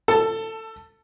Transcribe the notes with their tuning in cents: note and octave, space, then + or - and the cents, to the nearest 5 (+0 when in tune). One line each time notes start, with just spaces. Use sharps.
A4 +20 A5 +0